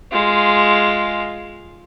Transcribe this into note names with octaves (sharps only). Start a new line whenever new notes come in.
G#3 F4